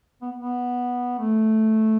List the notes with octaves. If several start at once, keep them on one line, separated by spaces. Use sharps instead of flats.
B3
B3
A3